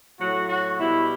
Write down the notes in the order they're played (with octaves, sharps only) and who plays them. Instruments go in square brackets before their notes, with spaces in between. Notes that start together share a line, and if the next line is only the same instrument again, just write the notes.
[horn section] A2 F#3 F#4
F#4
B2 G3 E4